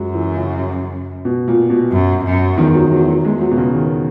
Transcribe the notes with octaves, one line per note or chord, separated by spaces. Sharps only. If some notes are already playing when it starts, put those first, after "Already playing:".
Already playing: F#2 F#3 G#3
E3
C#3
B2
A#2
B2
F#2
F#2
E2 D#3
F#3
E2 F#3
F#3
E2 G#3
F#3
B2
C#3
D#3